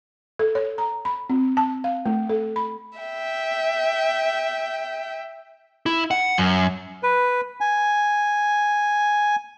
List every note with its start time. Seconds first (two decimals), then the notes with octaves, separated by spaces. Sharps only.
0.39 A4
0.55 C#5
0.78 A#5
1.05 B5
1.30 C4
1.57 A5
1.84 F5
2.06 A3
2.29 A4
2.56 B5
2.99 E5 G5
5.86 E4
6.11 F#5
6.38 F#2
7.03 B4
7.61 G#5